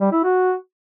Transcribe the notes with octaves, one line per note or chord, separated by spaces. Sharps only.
G3
E4
F#4